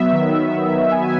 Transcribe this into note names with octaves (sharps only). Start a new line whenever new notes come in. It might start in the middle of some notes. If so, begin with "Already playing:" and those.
Already playing: F#3 B3 E5
D#3
B3
F#3
D#3
B3 G#5